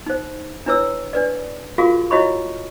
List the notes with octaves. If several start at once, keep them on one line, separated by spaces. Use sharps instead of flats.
D#4 C5
D4 E4 B4 C#5 E6
D4 B4 D5
F4 F#4 G#4 A#4 F5
E4 F#4 C#5 D#5 B5 C#6